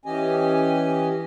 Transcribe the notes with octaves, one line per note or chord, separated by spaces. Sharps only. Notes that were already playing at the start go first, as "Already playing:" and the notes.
E3 C#4 G4 D#5 G#5